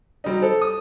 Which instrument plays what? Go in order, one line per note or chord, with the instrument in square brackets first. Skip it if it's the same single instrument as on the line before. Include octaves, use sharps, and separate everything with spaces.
[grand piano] F#3 G3 D#4
[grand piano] A4 [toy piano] C5
[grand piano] D#6